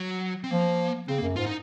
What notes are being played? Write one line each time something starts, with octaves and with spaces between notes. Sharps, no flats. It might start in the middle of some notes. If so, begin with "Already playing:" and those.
Already playing: F#3
C4
F3 A#3
C#3 C4
A#3
F#2
G#2 F4
D#4